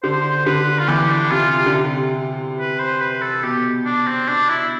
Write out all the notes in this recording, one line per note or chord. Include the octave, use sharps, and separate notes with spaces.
D3 C5
D3 B4
F4
E3 G4
D4
C3 F4
F4
D3
C3
B4
C5
B4
A4
B2 G4
D4
C4
D4
E4